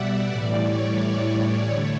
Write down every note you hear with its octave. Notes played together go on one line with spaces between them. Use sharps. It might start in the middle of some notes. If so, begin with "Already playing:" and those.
Already playing: B2 G3 D5 E5 F#5
A2 E3 G3 D5
C#5
D3 A3